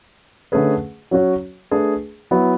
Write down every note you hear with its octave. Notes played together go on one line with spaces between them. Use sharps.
D3 A3 C#4 G#4 B4
F#3 C#4 F#4 C#5
A3 D4 G#4 B4
F#3 B3 E4